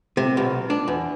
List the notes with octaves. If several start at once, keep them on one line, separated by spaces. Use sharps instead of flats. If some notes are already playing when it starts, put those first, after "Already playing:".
C3
B1
D4
E2